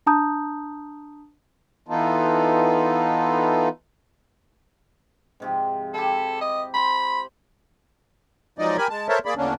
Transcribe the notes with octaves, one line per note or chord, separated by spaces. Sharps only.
D4 A5 A#5 D#6 G6
E3 B3 D#4 F4 A4
G#2 C3 F3
E4 G4 A4
D#5
C5 B5 C6
F3 F#3 G#3 D#4 D5 D#5
G4 A#4 G#5 B5
G#3 A5
A4 A#4 C5 C#5 E5 A5
A#3 G#4 D5 B5
E2 D3 A#3 C#4 D4